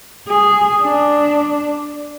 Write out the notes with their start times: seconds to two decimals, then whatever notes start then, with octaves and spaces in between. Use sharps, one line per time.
0.28 G#4
0.82 D4